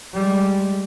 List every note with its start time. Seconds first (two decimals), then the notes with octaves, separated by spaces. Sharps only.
0.13 G3 G#3